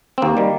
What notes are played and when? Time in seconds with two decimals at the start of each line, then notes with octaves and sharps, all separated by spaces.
0.18 C4
0.22 D#2 A#3
0.37 D#3 G3